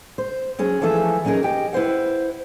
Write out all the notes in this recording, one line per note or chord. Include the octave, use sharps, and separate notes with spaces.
C5
F#3 C#4 G#4
E3 F3 A3 G#4 A4 E5
F#3 C#4 D#4 G#4 A#4
G4 D#5 G5
E4 B4 C5 F#5